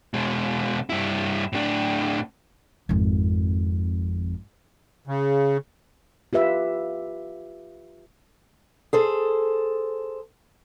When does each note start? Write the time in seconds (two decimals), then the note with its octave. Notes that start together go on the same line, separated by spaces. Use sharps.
0.14 B2 G#3
0.90 G2 E4
1.53 A2 D4
2.89 G#1 F2
5.07 C#3
6.33 F4 G4 B4 E5
8.93 G#4 A4 C5